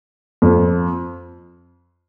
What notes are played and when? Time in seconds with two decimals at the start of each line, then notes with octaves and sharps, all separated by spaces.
0.42 F2